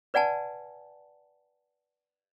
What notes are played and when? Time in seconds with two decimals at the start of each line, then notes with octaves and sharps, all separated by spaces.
0.14 B4 D5 F#5 G#5 A5